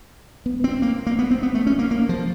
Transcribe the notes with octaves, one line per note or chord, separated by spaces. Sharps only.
B3
C4
A#3
A#3
B3
C4
B3
A3
C#4
A#3
A#3
F3